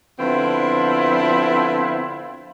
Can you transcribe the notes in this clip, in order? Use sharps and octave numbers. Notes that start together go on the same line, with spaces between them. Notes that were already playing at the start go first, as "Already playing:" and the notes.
D3 F3 B3 C4 E4 F4